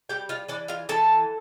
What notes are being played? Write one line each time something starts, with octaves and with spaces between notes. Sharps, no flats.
G3 G4 G5
F4 F5
E3 D4 D5
F4 F5
E3 A4 A5